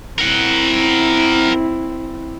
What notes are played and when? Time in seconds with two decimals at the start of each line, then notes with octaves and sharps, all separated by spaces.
0.19 C4 E4 A#4 F#5